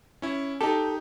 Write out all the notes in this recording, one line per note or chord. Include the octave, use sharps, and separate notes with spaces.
C#4 E4
D#4 G4 A4